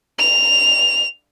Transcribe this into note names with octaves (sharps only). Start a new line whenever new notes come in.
F7